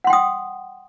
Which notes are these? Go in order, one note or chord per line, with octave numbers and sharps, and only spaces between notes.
F#5 G5 C6 D#6